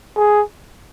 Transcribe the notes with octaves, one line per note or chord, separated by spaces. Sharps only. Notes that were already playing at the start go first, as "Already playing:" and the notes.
G#4